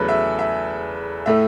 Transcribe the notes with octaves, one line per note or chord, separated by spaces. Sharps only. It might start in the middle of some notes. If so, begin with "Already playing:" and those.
Already playing: E2 C#3 F#3 A3 A4 B4
E5
E5
A2 A3 E5